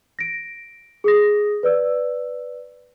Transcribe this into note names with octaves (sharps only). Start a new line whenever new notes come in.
A#6 D7
G#4 D#6 A#6
B4 D5 E6